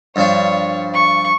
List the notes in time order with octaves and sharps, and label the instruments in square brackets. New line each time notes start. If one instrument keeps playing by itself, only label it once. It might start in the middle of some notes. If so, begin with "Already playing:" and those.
[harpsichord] G2 F3 D4 [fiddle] C#5
[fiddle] C#6